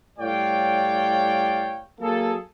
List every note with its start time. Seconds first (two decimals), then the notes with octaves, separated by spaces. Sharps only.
0.19 A2 G3 C#5 D5 F5 G5
2.00 F#3 A#3 G#4 A4